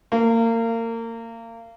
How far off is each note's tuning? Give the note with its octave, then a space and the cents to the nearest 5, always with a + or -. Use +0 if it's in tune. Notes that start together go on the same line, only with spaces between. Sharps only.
A#3 -30